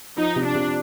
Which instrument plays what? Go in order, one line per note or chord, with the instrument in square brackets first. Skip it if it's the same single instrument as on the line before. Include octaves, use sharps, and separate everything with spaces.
[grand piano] F3 [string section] D#4
[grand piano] C3
[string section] D4
[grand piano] C3